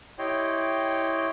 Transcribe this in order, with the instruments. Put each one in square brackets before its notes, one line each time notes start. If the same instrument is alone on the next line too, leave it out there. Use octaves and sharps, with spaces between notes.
[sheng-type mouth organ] E4 G4 C#5 D#5 G5 C6